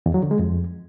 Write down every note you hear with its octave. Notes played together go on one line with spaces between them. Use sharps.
E2
F#3
D3
G#3
F2